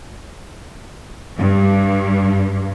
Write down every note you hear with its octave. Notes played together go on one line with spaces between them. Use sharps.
G2